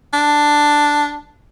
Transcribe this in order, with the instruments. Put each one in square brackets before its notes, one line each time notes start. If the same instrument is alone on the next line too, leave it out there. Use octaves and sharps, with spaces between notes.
[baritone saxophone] D4